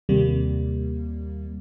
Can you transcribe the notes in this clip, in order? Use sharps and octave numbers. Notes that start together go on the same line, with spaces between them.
D#2 C3 G3 A#3